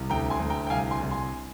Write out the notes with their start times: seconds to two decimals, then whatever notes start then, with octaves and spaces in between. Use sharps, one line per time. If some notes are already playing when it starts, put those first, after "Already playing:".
Already playing: C2
0.10 D2 G5 A#5
0.30 G#5 C6
0.40 D2
0.50 G5 A#5
0.67 G5
0.70 C2 F5 G#5
0.91 G#5 C6
1.02 C2
1.11 G#5 C6